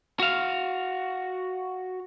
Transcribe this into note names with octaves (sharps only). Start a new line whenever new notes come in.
F#4 F5